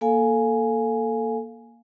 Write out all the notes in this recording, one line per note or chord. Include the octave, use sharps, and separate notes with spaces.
A#3 A4 F5 G#5